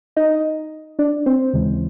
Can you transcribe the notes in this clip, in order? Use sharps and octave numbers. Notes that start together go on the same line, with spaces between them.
D#4 D#5
D4 D5
C4 C5
D#2 C#3 E3 G#3